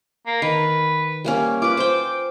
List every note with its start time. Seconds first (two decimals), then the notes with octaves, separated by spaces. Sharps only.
0.27 A#3
0.42 D#3 B4
1.24 G3 A#3 C#4
1.62 F4 B4 D6
1.77 C5 G5